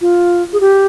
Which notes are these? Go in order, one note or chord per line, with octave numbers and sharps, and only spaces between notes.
F4
G#4
G4